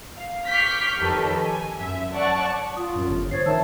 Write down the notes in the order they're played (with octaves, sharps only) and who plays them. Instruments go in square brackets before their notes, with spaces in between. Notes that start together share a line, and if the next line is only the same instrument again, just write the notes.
[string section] F5
C#6 D6 F6 G6 B6 C7
F2 D#3 G4 A4 B4 C#5
G#5
F#2 E5
C#5 D5 F#5 A5 C#6
[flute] F4 [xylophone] D#6
[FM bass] F#2
G1
[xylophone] C5 A6 C7 [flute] C#5
[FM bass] D#3 [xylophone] E5 E6 [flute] A5